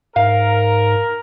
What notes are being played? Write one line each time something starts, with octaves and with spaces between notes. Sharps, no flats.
G#2 A#4 F5